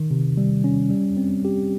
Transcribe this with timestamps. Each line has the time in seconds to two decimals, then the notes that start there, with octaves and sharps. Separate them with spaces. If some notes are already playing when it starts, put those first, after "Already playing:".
Already playing: D#3
0.11 C3
0.37 G3
0.64 C#4
0.90 G3
1.17 C4
1.45 G4